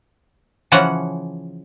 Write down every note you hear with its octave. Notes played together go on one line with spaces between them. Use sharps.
C#3 E3 F3 C#4 F#4 F#5